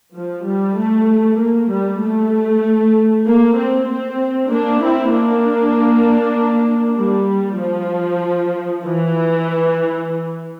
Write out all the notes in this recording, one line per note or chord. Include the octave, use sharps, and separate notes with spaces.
F3
G3
A3
A#3
G3
A3
A#3
C4
C4
A#3 D4
C4 E4
A#3 D4
G3
F3
E3